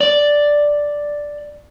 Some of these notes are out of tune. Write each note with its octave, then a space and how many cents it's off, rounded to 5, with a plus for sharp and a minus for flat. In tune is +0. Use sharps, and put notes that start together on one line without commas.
D5 +0